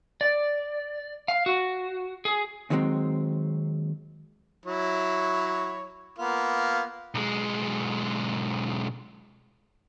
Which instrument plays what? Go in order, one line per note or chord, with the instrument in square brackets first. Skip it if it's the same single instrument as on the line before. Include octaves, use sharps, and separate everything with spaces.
[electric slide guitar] D5
F5
F#4
G#4
[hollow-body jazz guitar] D#2 D#3 F#3 G#3 C4
[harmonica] F#3 E4 C#5
A#3 B3 F4
[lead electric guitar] B1 G#3